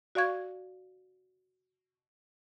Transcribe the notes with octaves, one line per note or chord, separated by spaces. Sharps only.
F#4 D5 F5 C#6 G#6